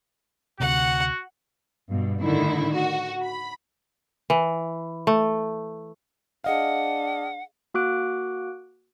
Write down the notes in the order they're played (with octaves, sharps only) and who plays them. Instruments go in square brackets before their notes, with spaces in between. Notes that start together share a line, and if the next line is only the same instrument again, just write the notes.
[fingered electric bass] D2 C3 [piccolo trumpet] F#4 [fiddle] F#5
[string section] G2 B2
A2 D3 D#3 E4
F#4
B5
[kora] E3
A3
[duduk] D4 [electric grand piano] G#4 D#5 F5 [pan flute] F#5
[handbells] A#3 F#4 D6 F#6 D7